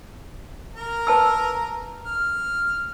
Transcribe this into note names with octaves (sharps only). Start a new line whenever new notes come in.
A#4 A#5
B4 A5 E6
F6